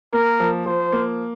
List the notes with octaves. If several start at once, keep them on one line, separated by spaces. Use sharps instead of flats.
A#3 A#4
F3
F3 C5
A#3